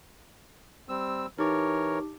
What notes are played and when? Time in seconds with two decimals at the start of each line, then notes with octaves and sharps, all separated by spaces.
0.89 G3 C4 E6
1.38 E3 D#4 G4 A#4 C#5 D6